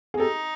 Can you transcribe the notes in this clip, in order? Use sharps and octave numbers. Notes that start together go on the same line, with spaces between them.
G#4
D#4 G4 A4